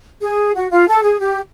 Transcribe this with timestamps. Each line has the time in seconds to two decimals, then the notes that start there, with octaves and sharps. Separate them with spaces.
0.22 G#4
0.54 F#4
0.71 F4
0.87 A4
1.04 G#4
1.20 G4